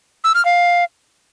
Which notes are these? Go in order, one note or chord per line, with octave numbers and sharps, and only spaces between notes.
E6
F6
F5